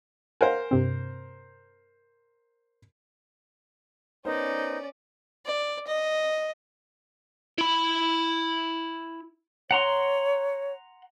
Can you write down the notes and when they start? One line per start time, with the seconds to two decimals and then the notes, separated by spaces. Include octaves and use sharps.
0.41 A#4 C5 F5 F#5 G#5
0.71 G2 C3 C4
4.25 B3 C#4 D#4 A#4 C5 D5
5.46 D5
5.87 D#5
7.58 E4 B5
9.71 C#5 F#5 A#5 C6